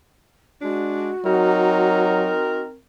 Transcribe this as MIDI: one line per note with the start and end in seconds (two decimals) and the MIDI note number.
0.62 1.10 56
0.62 1.10 62
0.62 2.61 66
1.26 2.33 54
1.26 2.75 60
1.26 2.67 63
1.26 2.75 70